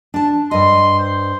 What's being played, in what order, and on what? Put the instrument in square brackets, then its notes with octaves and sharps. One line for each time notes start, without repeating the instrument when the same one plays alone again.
[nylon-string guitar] D4 A5
[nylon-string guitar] G2 D#5 [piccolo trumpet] C6
[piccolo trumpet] C5